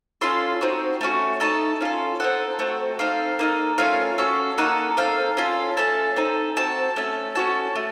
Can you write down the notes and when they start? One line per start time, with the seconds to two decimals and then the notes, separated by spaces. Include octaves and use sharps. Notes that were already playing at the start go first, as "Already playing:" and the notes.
0.21 C#4 F4 A4 C6
0.61 C4 D#4 F#4
1.01 A3 C#4 F#4
1.40 A3 D#4 A4 A5
1.81 C#4 F4 A4
2.20 C4 D#4 A4 F#5
2.59 A3 C4 F#4 A4
2.99 C4 D#4 A4 F5
3.39 A#3 D#4 A4
3.78 A3 C#4 F4 F5
4.18 C#4 F#4 A4
4.58 A#3 D#4 A4 F#5
4.97 C4 D#4 A4 F5
5.37 C#4 F4 A4
5.77 A3 C#4 A4 A5
6.16 C4 D#4 A4
6.56 C4 F#4 A4 A5
6.96 A3 C#4 A4
7.35 C#4 F#4 A4 A5
7.76 A3